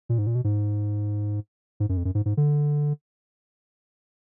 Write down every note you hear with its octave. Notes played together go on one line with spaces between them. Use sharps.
A#2
G#2
A#2
B2
G#2
G#2
F#2
F2
F#2
G#2
G#2
D3